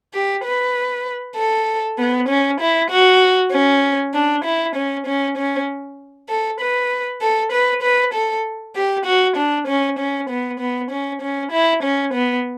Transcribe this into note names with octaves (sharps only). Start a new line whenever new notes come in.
G4
B4
A4
B3
C#4
E4
F#4
C#4
D4
E4
C#4
C#4
C#4
A4
B4
A4
B4
B4
A4
G4
F#4
D4
C#4
C#4
B3
B3
C#4
C#4
E4
C#4
B3